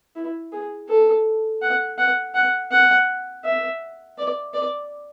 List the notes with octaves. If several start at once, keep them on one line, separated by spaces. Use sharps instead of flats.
E4
G#4
A4
F#5
F#5
F#5
F#5
E5
D5
D5